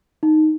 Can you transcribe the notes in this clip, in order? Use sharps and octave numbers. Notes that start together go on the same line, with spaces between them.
D#4